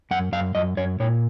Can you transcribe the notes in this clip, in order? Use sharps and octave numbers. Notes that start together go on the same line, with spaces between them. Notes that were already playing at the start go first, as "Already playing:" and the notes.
F#2 F#5
F#2 F5
F#2 D#5
F#2 C#5
A#2 C#5